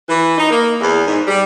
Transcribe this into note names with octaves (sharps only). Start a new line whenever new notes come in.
E3
D#4
A#3
E2
G#2
G3